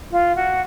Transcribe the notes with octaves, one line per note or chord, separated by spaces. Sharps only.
F4
F#4